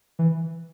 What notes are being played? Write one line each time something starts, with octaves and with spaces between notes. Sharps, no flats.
E3